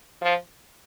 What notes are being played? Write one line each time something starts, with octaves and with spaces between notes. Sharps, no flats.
F3